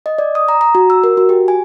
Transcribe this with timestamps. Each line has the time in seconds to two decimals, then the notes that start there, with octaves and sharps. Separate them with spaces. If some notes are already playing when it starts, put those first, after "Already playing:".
0.06 D#5
0.18 D5
0.35 D#6
0.48 A#5
0.61 A#5
0.75 F#4
0.90 E6
1.04 A#4
1.17 F#4
1.29 G4
1.48 G#5